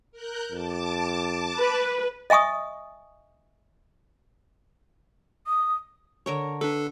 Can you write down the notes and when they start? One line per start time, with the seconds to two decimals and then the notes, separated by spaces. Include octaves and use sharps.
0.12 A#4 F#6 G6
0.51 F2 A5 D6
1.59 B4
2.30 D#5 E5 G#5 C#6 D#6
5.47 D#6
6.26 D3 A#4 C#5
6.61 D4 A4 B4